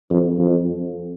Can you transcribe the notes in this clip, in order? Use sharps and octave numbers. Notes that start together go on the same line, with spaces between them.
F2
F2